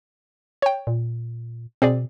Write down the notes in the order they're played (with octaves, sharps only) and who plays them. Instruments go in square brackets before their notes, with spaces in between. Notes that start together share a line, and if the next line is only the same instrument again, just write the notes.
[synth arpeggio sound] C#5 G5
[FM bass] A#2
[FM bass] B2 [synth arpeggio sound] C4 G#4 D5